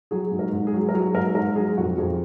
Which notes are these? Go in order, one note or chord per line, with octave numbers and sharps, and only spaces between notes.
F#3 G#4
G#2
A#4
G#2
G#4
F#3
A#4
F#3 G#4
G#2 A#4
G#2 A#4
F#3 G#4
F2 F#4
F2 G#4